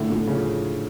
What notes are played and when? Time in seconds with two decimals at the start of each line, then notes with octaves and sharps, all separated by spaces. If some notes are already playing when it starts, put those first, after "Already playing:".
Already playing: A2 D3
0.10 D3
0.27 C#3 F3